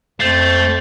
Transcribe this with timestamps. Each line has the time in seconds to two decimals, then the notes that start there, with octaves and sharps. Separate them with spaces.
0.20 F2 A3 C5 G6 A6 C7